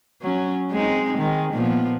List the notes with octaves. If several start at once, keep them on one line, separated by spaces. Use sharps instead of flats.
F#3 C#4
G#3 C4 D#4
D#3 G#3
A#2 F3 B3